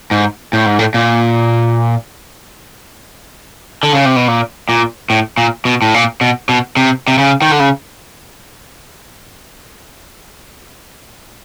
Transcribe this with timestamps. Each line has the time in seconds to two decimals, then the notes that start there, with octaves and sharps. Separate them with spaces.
0.11 G#2
0.53 A2
0.66 G#2
0.79 A2
0.94 A#2
3.83 D3
3.93 C#3
4.05 C3
4.16 B2
4.28 A#2
4.69 A#2
5.10 A2
5.38 A#2
5.65 B2
5.82 A2
5.94 A#2
6.21 B2
6.49 B2
6.77 C3
7.08 C3
7.18 C#3
7.42 D#3
7.51 D3
7.60 C#3